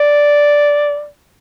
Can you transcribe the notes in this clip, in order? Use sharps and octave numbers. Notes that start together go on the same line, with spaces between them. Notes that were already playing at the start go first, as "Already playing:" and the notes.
Already playing: D5